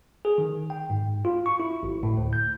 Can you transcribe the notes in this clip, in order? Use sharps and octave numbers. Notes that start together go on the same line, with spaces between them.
G#4
D#3
G5
G#2
F4
C#6
E4
G#1
A2
D2
G6